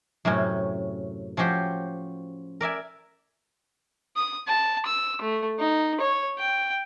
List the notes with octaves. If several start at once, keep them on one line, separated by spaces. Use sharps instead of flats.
F#2 A2 C3 C#4
F3 C#4 F#4 G4 C5
A#4 D5 E5 G#5
D#6
A5
E6
A3
D#4
C#5
G5